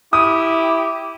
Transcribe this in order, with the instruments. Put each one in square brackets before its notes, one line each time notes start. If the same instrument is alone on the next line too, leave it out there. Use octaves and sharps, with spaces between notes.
[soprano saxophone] E4 [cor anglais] G4 [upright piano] D#6